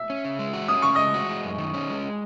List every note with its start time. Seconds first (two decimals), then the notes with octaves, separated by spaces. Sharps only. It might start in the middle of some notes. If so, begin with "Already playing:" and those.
Already playing: E5
0.10 C#4
0.25 C#3
0.39 G#3
0.53 F#4
0.68 C#4 D#6
0.82 C#3 C#6
0.95 G#3 D#5 D#6
1.14 F#4
1.29 G#3
1.44 F#2
1.58 D#3
1.74 C#4
1.89 G#3